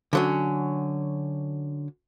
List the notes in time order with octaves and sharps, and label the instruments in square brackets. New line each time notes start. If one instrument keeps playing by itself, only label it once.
[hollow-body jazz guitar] D3 F#3 C#4